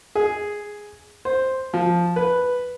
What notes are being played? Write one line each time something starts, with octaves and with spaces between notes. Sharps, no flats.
G#4
C5
F3
B4